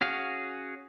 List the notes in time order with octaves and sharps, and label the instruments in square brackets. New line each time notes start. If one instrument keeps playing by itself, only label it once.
[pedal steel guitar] C#4 F#4 G#4 F5